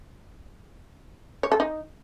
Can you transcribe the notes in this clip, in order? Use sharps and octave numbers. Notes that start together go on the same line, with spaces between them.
C#5
A4
D#4